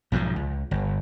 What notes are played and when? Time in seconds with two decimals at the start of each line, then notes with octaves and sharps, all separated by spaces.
0.12 B1 G#2 D#3 F3
0.36 C#2
0.71 G1